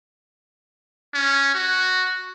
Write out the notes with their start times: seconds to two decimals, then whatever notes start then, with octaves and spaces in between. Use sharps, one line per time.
1.14 C#4
1.54 F#4